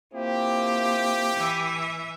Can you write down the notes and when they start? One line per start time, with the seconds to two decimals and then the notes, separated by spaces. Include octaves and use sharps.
0.14 A#3 C4 E4 F4 G4
1.36 E3 E5